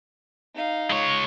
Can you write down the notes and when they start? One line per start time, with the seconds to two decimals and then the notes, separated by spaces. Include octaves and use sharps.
0.55 D#4 F5
0.90 G#3 C#5